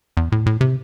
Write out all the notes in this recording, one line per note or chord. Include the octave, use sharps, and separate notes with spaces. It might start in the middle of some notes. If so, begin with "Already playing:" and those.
E2
A2
A2
C3